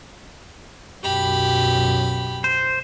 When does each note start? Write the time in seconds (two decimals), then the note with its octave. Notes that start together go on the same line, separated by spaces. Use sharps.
1.03 B1 F#2 G4 B5
2.44 C5